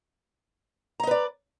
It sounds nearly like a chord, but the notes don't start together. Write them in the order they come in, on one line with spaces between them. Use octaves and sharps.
A#5 D#5 B4 D5